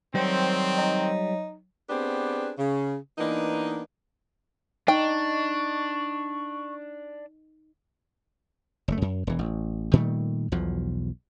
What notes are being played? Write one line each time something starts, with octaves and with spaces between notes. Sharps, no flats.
D#3 F#3 G3 C4 C5 C#5
D#4
B3 C4 D4 G4 G#4 B4
C#3
E3 A#3 B3 D4 D#4
D4 D#4 G5 C#6
F#1 A3
F#2
E1 E3
A1
A#2 D#3 G3 A3
B1 E2 B2 F3